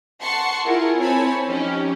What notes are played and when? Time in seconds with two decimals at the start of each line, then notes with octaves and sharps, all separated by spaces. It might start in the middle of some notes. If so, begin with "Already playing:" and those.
0.20 F#5 A5 C6 C#6 C7 C#7
0.65 E4 F4 G#4 A#4
1.00 C4 E4 C#5 G#5 A5 B5
1.46 F3 C#4 D#4 G4